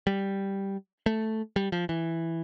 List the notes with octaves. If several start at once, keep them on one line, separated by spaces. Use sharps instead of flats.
G3
A3
G3
F3
E3